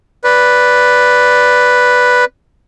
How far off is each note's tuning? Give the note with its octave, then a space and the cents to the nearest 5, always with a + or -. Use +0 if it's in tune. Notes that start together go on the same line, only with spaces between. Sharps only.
B4 +0 D5 -5